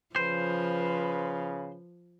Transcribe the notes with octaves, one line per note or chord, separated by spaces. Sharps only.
C#3 F3 B4 C5